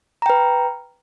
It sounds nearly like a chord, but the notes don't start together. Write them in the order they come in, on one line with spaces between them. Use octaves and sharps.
A#5 G5 B4